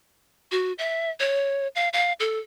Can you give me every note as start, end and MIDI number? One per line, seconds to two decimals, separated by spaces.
0.52 0.73 66
0.78 1.10 76
1.20 1.68 73
1.75 1.89 77
1.93 2.13 77
2.20 2.39 69